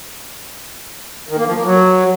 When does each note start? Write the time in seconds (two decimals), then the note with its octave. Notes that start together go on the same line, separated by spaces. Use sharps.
1.29 D#3
1.38 A#3
1.47 F3
1.55 A#3
1.64 F#3